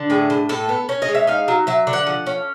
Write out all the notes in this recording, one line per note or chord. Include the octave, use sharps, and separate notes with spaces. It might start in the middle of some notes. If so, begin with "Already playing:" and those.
Already playing: D3
A2 G#4
A2
A2 A4
B3
C#4
D#5
G#3
E5
D#4 F5
F#3
F#3 E5
D3
F#5
F3
C#4